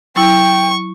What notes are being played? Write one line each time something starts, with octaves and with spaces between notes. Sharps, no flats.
F#3 E4 G5 C#6